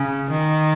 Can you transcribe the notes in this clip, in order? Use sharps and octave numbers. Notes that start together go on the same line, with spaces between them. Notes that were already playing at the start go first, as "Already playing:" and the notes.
Already playing: C#3
D#3